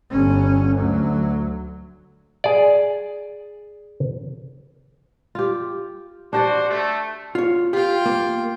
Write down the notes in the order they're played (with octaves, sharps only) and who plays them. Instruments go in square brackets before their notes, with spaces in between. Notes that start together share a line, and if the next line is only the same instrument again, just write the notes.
[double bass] G1 C#4
D2 F#3
[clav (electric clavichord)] G#4 D5
[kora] F4 G4
[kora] D4 G4 D5 [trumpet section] F#4 C5
[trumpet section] A3
[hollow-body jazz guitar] F4 C#5
[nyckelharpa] F4 G5 [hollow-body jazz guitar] G4
[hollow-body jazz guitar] A#3